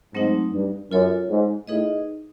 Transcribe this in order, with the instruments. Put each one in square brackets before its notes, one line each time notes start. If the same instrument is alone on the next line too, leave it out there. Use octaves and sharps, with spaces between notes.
[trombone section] G#2 [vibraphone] F#3 A3 C4 D#4
[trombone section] G2
[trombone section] F#2 [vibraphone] F4 A4 C#5
[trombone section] G#2
[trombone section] A2 [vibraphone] D#4 G#4 B4 D#5